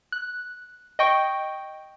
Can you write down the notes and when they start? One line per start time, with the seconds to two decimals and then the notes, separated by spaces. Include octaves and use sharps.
0.12 F#6
0.99 D#5 G5 C#6